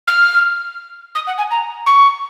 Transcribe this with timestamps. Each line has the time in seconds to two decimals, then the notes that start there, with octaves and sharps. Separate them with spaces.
0.07 F6
1.15 D#6
1.27 F#5
1.38 G#5
1.51 A#5
1.86 C#6